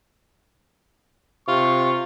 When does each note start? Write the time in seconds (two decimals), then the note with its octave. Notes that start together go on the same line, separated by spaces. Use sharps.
1.48 C3 F4 C#6